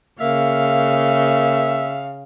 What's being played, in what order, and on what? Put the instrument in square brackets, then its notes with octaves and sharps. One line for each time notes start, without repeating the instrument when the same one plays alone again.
[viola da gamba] C#3 [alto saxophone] A#3 [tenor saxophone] E5 [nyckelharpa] F5